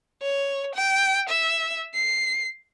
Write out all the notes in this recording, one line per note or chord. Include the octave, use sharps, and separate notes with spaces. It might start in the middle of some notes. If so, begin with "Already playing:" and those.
C#5
G5
E5
C7